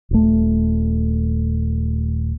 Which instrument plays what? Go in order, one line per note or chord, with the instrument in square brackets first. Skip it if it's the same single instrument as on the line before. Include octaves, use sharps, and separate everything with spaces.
[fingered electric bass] D#1 A3